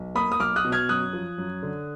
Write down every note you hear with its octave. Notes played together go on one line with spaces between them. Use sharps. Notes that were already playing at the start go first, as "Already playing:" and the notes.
Already playing: B1
A#3 B5 D#6
D#6
B1 D6 F6
D#6 F#6
B2
F6 G#6
F#2 D#6 F#6
F3
F#2
D3